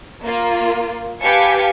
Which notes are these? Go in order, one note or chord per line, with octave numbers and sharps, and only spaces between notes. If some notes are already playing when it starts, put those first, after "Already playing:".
A#3 F4
G4 B4 F5 G#5 A5 C#7